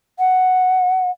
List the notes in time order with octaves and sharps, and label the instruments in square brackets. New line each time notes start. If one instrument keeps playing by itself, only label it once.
[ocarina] F#5